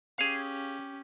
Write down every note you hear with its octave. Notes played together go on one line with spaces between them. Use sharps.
C#4 G4 G#4 F5